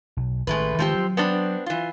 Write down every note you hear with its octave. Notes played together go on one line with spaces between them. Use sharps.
B1
A1 D#3 E3 G#3 A3 B4
D#3 F3 G#3 A3 C4 G4
F#3
B3 C4 D4
E3 F4